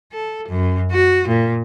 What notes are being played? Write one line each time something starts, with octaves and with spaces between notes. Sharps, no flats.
A4
F#2
F#4
A#2